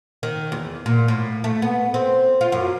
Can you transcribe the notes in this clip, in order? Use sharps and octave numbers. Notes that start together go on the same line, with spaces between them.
D#3
E2
A#2
A2
A3
B3
C4
F4
F#2